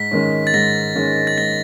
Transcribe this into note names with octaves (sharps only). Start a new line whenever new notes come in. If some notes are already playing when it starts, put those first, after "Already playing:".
Already playing: G#2 B6
D#3 G#3 C#4
A6
G#2 A#6
D#3 G#3 C#4
A6
G#2 A#6